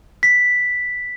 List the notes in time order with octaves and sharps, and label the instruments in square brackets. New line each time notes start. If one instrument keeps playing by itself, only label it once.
[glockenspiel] B6